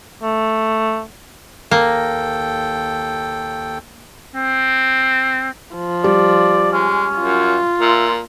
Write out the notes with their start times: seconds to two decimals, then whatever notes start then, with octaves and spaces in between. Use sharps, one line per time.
0.22 A3
1.71 D#2 A#3 A4 G5
4.35 C4
5.75 F3
6.04 G3 D5
6.72 G#3 C#4
7.18 F#2 F4
7.81 A#2 E5